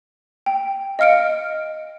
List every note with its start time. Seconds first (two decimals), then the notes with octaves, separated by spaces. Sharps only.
0.46 G5
0.99 D#5 F5 F6 C#7 D7